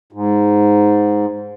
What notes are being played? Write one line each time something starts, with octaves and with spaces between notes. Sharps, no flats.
G#2